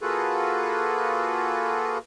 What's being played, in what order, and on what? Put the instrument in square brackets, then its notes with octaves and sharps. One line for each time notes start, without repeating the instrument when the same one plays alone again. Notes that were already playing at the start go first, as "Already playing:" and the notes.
[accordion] A#3 F4 F#4 G#4 A4 B4